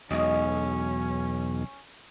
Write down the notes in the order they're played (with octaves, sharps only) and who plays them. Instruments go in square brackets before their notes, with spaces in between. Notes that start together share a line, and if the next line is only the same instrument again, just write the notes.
[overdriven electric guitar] B1 [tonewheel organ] E2 B2 [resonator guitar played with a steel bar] G#3 D#5 [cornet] C#4